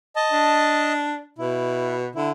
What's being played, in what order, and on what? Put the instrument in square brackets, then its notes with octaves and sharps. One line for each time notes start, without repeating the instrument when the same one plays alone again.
[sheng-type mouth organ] D#5 A5
[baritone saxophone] D4
[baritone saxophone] B2 [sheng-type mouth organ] E4
[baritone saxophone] D3 [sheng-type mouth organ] E4